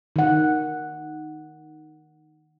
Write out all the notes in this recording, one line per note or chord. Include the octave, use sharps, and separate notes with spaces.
D#3 F#5